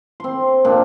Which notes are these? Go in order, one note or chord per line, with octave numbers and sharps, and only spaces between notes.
C4 C6
A#2 D4